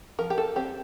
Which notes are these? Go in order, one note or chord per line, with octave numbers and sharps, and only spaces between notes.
F3 A#4
G4
A4
C4 G4